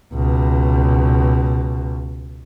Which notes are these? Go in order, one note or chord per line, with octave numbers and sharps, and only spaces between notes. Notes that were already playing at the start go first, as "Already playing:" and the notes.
C#2 B2